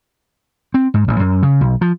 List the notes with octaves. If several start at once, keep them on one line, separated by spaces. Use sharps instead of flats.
C4
G#2
A1
F#2
C#3
B1
F3